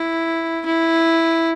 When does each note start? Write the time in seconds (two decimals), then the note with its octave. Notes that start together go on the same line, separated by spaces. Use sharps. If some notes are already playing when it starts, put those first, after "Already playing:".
Already playing: E4
0.66 E4